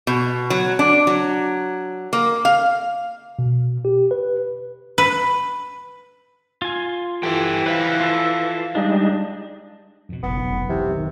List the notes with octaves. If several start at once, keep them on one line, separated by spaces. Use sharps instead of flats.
B2
F#3
D4
F#3
A#3
F5
B2
G4
B4
B4
F4 G#5
E3 G4 A4 G5
B4 C5 E5 F5
F4 A4
G3 G#3 D4 D#4
F2 B2
F#1 B1 F2 G#2 B3
F1
C3 E3
D#3